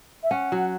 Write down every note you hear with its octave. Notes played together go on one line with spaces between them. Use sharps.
E5
C#4 F#5
F#3